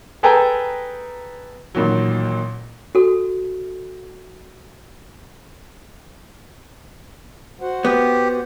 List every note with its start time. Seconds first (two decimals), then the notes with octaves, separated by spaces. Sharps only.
0.23 G#4 A4 B4 G5 G#5 A#5
1.75 A1 A#2 D#3 F#3
2.95 F#4 A4
7.61 F#4 C5 F#5
7.85 B3 G4